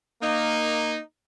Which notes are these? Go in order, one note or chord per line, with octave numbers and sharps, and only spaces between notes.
A#3 D#4